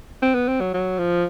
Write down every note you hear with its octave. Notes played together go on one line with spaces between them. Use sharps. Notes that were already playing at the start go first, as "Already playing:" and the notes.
C4
B3
C4
F#3
F#3
F3